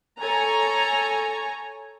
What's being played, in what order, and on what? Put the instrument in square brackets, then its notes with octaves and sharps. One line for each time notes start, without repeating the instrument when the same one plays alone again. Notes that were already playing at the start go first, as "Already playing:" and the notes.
[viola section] A4 C#5 G#5 A#5